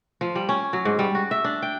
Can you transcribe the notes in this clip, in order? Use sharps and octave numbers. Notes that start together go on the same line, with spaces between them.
F3
G3
C#4
F#3
G#2
G3
F#4
E5
D4
G5